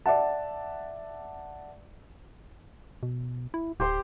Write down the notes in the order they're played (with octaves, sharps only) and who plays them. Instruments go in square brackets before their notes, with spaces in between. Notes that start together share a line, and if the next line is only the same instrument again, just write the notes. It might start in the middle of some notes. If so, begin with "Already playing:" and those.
[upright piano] D5 E5 F#5 A5
[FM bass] B2
E4
[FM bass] D1 [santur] G4 C5 C6